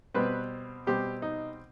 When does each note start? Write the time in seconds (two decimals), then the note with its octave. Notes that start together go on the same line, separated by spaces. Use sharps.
0.14 B2 G3 C4 B4
0.87 B2 G3 C4 G4
1.22 D#4